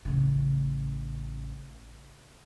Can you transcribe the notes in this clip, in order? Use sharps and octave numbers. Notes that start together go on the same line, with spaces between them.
A1 C#3